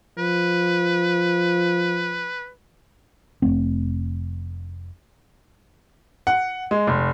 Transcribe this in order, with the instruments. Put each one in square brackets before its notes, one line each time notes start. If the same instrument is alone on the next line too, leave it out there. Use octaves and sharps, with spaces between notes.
[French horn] F3 [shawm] B4
[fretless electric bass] F1 G2 A3 C4
[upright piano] F#5
G#3
F1